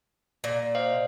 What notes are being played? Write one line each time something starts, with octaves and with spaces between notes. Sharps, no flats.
A#2
C5 D#5 F5